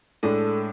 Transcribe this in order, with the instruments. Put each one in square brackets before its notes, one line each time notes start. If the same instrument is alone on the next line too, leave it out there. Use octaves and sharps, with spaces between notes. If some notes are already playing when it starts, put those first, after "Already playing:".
[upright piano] A2 G#3 D4 [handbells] A4